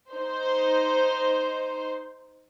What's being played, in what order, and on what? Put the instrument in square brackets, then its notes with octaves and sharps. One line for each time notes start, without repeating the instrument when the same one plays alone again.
[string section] D#4 C5